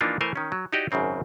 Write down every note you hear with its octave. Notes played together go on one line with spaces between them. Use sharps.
E3 F3 A#3 D4 D#4 F4
E3 A3 A#4 C5 G#5
D#3 C#4
F#3
D#4 E4 F#4 G4 D5 D#5
G#1 F#2 C#3 C4 C#5